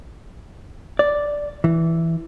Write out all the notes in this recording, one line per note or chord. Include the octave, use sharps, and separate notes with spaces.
D5
E3